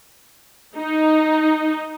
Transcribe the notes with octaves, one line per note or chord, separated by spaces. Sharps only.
D#4